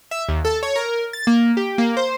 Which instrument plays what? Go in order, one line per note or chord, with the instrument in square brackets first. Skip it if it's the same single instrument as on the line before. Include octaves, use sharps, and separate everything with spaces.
[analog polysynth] E5
D#2
A4
C#5
A#4
A6
A#3
G4
A#3
C5